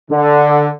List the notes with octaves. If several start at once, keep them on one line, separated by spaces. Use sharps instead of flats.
D3